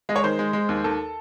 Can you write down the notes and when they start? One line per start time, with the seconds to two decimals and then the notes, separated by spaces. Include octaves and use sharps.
0.09 G#3 D#5
0.16 C#5
0.24 D#3 C5
0.39 G#3
0.53 G#3
0.69 D#2
0.84 D#2 A4